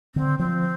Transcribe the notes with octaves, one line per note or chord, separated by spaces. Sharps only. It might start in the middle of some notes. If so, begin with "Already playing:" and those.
D3 C4
F3 C4